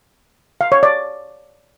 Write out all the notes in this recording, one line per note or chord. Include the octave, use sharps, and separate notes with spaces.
F5
C#5
D5